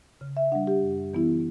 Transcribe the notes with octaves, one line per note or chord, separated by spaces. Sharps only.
C#3
E5
G3 D4 F#5
G4
F#2
E3 B3 E4